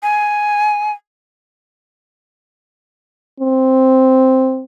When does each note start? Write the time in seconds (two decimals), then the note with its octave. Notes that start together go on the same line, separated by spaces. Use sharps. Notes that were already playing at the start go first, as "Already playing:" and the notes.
0.03 G#5
3.40 C4